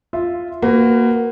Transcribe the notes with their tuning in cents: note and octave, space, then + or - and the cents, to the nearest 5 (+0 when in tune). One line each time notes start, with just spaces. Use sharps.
F4 +0 E5 +0
A#3 +0 F#4 +0 B4 +30